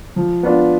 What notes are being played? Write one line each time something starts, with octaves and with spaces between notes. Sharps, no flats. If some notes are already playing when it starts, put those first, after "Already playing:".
F3
B3 D4 F4